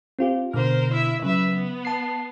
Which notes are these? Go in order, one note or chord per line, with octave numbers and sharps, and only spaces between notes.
C4 F4 G4
B2 D3 A#4 C5 F6
E4 E5
C#3 F#3 B4 E5
B3
A5 C7